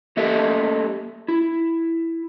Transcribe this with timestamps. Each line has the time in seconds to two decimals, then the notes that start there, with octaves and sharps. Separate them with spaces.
0.17 A3 A#3 G4 A4 D#5 E5
1.28 E4